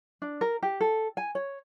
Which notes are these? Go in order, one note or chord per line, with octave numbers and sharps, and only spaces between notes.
D4
A#4
G4
A4
G#5
C#5